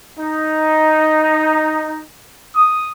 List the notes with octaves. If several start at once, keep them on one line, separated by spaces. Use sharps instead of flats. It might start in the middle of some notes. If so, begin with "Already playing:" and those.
D#4
D#6